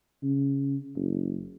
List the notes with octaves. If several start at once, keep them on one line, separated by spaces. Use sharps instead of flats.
C#3
F#1